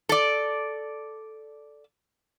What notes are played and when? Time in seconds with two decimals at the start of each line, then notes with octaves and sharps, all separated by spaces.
0.09 A4 D5